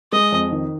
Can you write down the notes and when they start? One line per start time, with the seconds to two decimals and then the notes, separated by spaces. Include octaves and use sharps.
0.12 G#3 D#5
0.32 F2
0.52 D#3